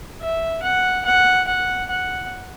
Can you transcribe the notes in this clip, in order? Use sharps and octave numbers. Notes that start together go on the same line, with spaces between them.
E5
F#5
F#5
F#5
F#5